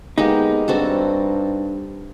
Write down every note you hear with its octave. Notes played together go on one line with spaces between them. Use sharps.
G#3 A#3 B3 D#4 G4
G2 C4 F#4 A4